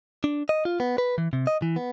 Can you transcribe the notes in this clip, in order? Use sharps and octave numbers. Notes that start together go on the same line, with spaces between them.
D4
D#5
F4
B3
B4
E3
C3
D#5
E3
B3